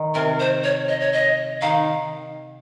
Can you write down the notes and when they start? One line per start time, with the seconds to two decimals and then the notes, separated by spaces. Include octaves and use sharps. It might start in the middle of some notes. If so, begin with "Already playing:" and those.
Already playing: D#3
0.15 C3 A#4
0.40 C5
0.64 C#5
0.89 D#5
1.00 C#5
1.13 D#5
1.62 D#3 F5